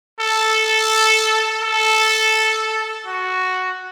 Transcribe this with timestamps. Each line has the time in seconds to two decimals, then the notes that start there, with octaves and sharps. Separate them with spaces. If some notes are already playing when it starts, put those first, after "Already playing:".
0.20 A4
1.63 A4
3.06 F#4